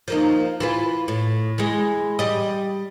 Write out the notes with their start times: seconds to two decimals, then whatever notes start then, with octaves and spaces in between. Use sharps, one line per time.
0.08 F3 A#3 D#4
0.60 E3 F4 B4
1.08 A2
1.58 E3 G#3
2.19 G3 D#5